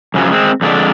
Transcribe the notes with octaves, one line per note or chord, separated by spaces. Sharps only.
F#2 C#3 F3 F#3
G#3 C4
F2 D3 G#3 D5